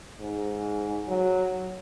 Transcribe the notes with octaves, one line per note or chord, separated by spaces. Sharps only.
G#2
F#3